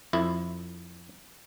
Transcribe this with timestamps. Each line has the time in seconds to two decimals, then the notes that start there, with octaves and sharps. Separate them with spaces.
0.13 F2 E4